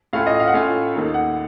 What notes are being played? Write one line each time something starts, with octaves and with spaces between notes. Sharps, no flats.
A2 A3 C#4 F4 F5
D#5
F5
F#5
A2 A3 C#4 F4 F5
D#2 D#3 A3 D#4
F#5